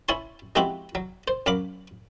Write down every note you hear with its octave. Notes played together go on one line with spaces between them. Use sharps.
E4 C#5 G#5 C6
F3 G#3 C4 E4 F#4 G4
F#3
C5
F#2 F#3 F5 B5 D6